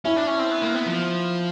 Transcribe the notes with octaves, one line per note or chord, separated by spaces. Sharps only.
C#4 E4
D4
C#4
C4
B3
A#3
B3
F3